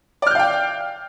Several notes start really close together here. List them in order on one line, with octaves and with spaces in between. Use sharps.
D5 F6 G6 F5 G5